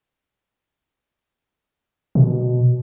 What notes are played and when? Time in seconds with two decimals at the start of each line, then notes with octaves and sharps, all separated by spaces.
2.15 B2